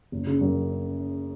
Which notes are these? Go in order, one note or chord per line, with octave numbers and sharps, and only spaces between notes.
F#1
C#3
F#2